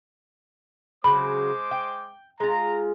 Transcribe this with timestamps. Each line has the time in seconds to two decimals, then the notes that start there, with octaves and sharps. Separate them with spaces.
1.04 C#3 F#3 G#3 C5 B5 D6
1.71 G5
2.40 G#3 F4 A#5